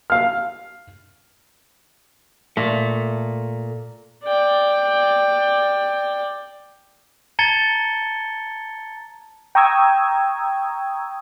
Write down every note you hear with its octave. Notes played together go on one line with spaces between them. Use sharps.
F5 F6
A#2 A3
D5 G5
A5 A#5 G#6 A6 C#7 G7
G5 A#5 C#6 D#6 E6 G#6